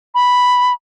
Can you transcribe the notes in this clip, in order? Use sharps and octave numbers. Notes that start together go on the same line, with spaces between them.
B5